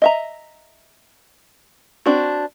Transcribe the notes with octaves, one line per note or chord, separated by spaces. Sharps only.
D#5 E5 A#5
C4 D4 F#4